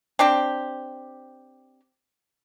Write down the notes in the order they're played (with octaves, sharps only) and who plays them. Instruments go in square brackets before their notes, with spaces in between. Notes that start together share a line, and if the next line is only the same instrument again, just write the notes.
[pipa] C4 D4 G4